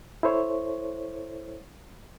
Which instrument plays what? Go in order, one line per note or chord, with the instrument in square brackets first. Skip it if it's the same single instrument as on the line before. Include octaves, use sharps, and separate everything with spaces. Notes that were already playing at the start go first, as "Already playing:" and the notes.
[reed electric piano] E4 A4 C5 C#5